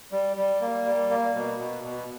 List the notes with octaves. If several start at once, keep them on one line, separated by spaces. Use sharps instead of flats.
G3
G3
A#3
G3
A#3
B2
B2
B2